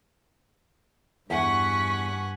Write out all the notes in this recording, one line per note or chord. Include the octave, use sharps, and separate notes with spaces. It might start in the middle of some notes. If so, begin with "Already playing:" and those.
E2 G2 F#5 G#5 C#6 B6